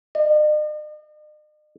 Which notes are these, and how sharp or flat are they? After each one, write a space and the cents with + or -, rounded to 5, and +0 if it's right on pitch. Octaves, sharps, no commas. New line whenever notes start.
D#5 -45